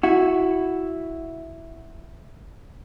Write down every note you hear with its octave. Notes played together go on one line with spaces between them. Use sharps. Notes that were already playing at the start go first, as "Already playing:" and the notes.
E4 F#4